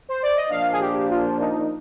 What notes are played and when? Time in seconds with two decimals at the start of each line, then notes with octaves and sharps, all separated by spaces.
0.09 C5
0.23 D5
0.36 D#5
0.50 A#2 F3 A#3 D4 F5
0.72 G#4
0.80 G4
1.10 F4
1.40 D#4